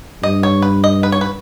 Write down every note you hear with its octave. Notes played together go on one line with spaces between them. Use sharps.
G2 D#5
C#5
B4
D#5
B4
C#5
B4